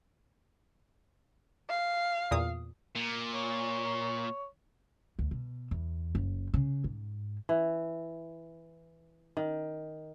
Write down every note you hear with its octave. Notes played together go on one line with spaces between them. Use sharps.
F5
E2 A#2 D#6
A#2
C#5
D2
B2
E2
F#1
C#3
G#2
E3
D#3